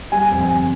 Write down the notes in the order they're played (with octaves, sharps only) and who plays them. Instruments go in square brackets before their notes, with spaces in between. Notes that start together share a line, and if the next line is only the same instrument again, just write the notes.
[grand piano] G3 G#5
F2
G#5
G1